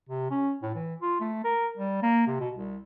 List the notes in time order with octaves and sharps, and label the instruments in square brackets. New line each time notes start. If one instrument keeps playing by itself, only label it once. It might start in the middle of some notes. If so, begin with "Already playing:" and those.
[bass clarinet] C3
C#4
A2
E3
F4
A3
A#4
G3
A#3
C3
B2
C2